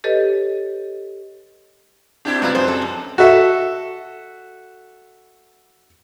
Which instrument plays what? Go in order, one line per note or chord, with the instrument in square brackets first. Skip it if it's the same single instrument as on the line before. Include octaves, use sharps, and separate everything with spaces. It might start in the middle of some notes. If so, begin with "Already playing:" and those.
[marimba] G4 A4 B4 C#5 D#5
[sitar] A#2 E4 G4 [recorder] C4 [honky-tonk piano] D4
[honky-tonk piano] C#2 B4 [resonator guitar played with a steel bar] F#3 F4 [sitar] D4 E4
[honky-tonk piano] F#2 [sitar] G#3 A#3 D4 [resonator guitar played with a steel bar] C5
[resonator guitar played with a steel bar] A4
F3
[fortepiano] F#4 A4 E5